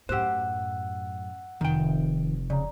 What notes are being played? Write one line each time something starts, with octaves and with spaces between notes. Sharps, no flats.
F#2 A2 G4 C5 F#5 E6 F#6
F1 D#3 G5
C#3 D5 A#5